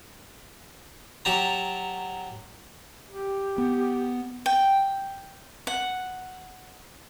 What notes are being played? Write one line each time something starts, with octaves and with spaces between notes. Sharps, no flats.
F#3 G4 A5 A#5
G4
B3
G5
F#5